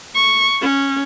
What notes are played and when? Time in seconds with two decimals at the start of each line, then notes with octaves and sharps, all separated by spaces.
0.15 C#6
0.61 C#4